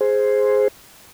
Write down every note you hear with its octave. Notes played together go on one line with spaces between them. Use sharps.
G#4 C5